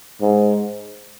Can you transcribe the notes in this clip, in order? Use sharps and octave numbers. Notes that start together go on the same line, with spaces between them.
G#2